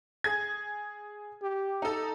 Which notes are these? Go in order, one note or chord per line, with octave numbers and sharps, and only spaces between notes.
G#4 G#6
G4
D#4 A4